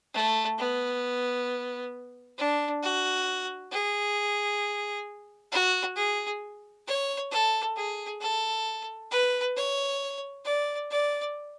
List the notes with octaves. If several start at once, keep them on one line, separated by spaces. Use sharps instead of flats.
A3
B3
D4
F#4
G#4
F#4
G#4
C#5
A4
G#4
A4
B4
C#5
D5
D5